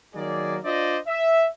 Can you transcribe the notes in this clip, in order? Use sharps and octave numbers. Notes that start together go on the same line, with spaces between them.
D#3 F#3 A#3 G#4 D5
D4 F4 C5 D5 D#5
E5